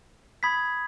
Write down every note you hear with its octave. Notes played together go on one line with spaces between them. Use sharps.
B5 D#6 G#6 B6